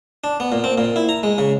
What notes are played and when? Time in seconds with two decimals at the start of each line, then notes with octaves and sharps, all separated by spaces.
0.24 D4
0.40 B3
0.52 A#2
0.64 C4
0.78 A#2
0.96 E4
1.09 A#5
1.23 G#3
1.38 C#3